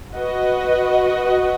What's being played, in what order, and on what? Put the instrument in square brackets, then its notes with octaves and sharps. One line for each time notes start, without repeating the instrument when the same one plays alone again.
[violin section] F#4 B4 D#5